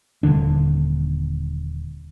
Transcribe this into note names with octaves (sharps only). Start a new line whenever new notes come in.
D#1 B1 D3 D4